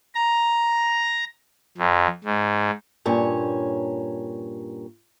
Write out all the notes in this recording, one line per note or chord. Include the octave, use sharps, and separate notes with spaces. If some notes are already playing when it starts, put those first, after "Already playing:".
A#5
F2
G#2
G2 A#2 C#4 C#5